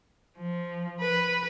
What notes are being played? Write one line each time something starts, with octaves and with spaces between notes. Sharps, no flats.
F3
B4